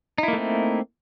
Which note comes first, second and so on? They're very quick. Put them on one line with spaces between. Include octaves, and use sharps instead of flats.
D#4 E4 A#3 A3 C4